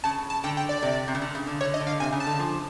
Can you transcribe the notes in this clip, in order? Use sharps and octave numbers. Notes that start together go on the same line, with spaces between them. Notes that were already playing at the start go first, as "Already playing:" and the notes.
C#3 A5
A5
D3 G5
G5
D5
C3
C3
C#3
D3
C#3
D3
D3 C#5
D#5
D3
F5
C3 G#5
C#3
A5
D3
F3